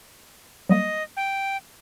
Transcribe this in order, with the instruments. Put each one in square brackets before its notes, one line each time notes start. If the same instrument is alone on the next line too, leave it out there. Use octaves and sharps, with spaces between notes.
[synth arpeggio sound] F#3 G3 A#3 [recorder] D#5
[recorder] G5